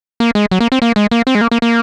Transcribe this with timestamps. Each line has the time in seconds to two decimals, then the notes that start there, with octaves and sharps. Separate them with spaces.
0.20 A#3
0.35 G#3
0.51 F#3
0.61 A#3
0.72 C4
0.82 A#3
0.96 G#3
1.11 A#3
1.27 C4
1.35 G#3
1.41 A#3
1.51 A#3
1.62 A#3